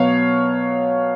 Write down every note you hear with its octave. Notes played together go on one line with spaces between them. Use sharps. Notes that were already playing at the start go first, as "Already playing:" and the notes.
Already playing: B2 F#3 B3 C#5 F5